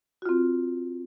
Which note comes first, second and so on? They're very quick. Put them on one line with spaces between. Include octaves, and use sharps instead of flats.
F#4 F4 C4